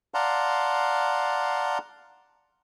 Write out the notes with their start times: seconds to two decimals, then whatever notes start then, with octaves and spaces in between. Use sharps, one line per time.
0.14 D5 F5 F#5 A5 A#5 C6